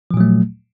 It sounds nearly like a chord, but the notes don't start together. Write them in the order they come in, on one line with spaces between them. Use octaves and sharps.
F3 A#2 F#3 A3